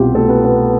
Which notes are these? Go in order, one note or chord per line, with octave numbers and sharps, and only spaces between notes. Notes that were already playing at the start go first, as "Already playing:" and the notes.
Already playing: C2 B2 F4 G4
A3 A4
B3 B4
B3 B4